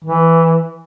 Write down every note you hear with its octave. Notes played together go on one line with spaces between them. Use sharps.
E3